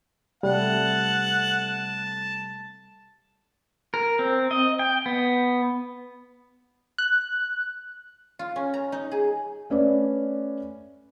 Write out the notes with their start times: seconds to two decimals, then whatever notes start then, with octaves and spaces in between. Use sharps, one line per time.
0.43 C3 G3 A3 A4 F#5 A5
3.94 A#4
4.19 C4
4.51 D#5
4.79 G5
5.06 B3
6.98 F#6
8.39 F4
8.56 C#4
8.74 A#5
8.92 D#4
9.11 G#4
9.70 A3 C#4 B4 D5